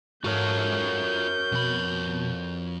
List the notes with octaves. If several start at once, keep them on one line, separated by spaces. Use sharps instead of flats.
G#2 F4 F#4 A4 A#4 C#5 G6
F2 B2 B5